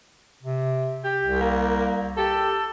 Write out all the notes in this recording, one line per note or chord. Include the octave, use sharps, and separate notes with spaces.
C3
G4
C2
A#3
G4 A4